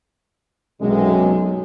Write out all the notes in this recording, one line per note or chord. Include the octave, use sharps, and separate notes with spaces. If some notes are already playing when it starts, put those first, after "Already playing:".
B1 F#2 C3 G#3